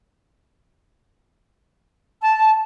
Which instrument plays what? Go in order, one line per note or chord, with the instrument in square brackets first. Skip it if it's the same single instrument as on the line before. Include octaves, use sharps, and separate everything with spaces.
[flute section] A5